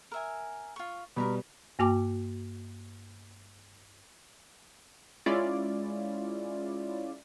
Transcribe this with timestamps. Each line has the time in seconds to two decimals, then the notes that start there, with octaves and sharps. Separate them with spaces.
0.12 A#4 E5 G#5
0.76 F4 C#6
1.16 B2 G3 A#4 A#5 B5
1.79 G2 A#3 F#4 G5 D6
5.26 G#3 C#4 E4 F4 D5